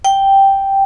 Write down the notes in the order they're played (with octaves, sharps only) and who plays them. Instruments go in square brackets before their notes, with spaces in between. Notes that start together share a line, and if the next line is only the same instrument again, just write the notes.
[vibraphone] G5